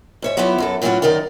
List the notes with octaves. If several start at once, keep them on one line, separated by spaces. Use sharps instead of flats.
G#2 C#5 E5
F#3 B3 E4 F4 G4 C#5
F#2 F#3 A4
A2 E3 F#3 C#4 F4 F#4
F#2 D#3 D#4 A#4 D5